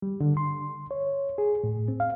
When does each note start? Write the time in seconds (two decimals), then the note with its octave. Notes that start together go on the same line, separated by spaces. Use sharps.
0.02 G3
0.20 D3
0.37 C6
0.91 C#5
1.38 G#4
1.64 A2
1.88 C4
2.00 F5